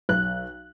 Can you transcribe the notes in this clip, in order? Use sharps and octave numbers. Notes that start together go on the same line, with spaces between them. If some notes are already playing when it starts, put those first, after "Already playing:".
B1 F#6